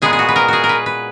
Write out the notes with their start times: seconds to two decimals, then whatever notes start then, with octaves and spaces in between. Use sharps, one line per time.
0.02 A#2 G#3 B3 G#4
0.13 G#4
0.19 F#4
0.29 B4
0.36 A#4
0.48 F#4 G#4
0.64 A#4
0.69 B4
0.86 B4